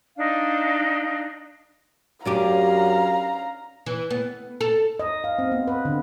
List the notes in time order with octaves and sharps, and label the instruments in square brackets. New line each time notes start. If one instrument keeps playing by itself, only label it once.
[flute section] D4 D#4 F5
[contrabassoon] F#2 [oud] C#4 D4 G4 [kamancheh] F5 A#5
[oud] E3
B3
A4
[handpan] D#5
F5
C4
B3
B4
D3